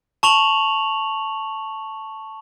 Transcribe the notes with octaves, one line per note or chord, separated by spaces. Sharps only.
A5 C#6 F7 F#7